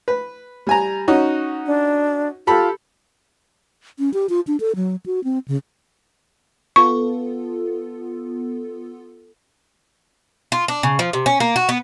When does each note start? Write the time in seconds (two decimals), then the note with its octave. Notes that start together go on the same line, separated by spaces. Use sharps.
0.08 B4
0.67 G3 G#5 A#5
1.08 C#4 D#4 F#4
1.66 D4
2.47 F4 G4 A4 B5
3.99 C#4
4.14 G4
4.29 F4
4.47 D4
4.60 A4
4.76 F#3
5.06 F#4
5.24 C4
5.48 C#3
6.76 B3 F4 A4 C#6
10.52 F4
10.68 D4
10.83 C#3
10.99 F3
11.13 C3
11.26 C#4
11.40 A#3
11.56 F#4
11.69 B3